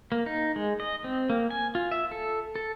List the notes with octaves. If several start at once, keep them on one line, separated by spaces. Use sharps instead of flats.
A#3
D#4
G#3
D#5
C4
A#3
G#5
F4
E5
A4
A4